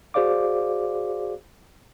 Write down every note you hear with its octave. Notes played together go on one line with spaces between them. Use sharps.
F#4 G#4 C5 D5 F5 D6